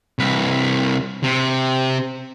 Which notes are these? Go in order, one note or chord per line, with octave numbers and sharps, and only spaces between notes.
C2 B4
C3